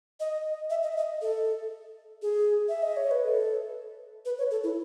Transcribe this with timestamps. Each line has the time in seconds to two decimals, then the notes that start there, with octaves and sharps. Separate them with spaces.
0.20 D#5
0.70 E5
0.83 D#5
0.92 E5
0.96 D#5
1.22 A4
2.22 G#4
2.68 E5
2.82 D#5
2.97 C#5
3.11 B4
3.25 A4
4.25 B4
4.38 C#5
4.51 A4
4.64 E4